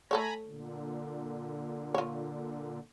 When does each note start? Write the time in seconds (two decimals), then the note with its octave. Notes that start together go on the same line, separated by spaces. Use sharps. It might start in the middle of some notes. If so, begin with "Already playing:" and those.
0.11 A3 A4 C#5 G#5 A#5 B5
0.46 A#2 D3
1.94 F4 C#5